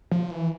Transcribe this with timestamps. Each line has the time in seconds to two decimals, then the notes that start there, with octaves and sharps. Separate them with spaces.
0.12 F3
0.31 E3